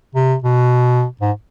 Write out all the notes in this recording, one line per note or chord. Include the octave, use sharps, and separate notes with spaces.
C3
B2
G#2